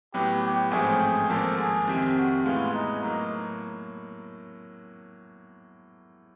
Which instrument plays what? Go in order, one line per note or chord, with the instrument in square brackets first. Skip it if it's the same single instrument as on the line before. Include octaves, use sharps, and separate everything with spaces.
[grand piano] A2 F#3 B3 [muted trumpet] G4
[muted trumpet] G4
[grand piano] A1 G#2 F3 A3 C4 [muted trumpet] G#4
[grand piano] G#1 G#2 F3 A#3 [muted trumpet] A4
[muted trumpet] G#4
[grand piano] F2 C3 D#3
[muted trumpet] F#4
[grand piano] A2 E3 G#3 B3 [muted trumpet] F4
[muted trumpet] D#4
[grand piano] A2 F#3 A#3 [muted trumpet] D#4